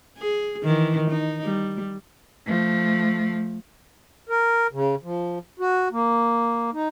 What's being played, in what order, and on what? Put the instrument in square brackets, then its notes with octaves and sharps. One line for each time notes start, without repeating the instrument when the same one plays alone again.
[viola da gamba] G#4
D#3 E3
D#4
G3
[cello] F3 A3
[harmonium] A#4
C#3
F3
F#4
A#3
D#4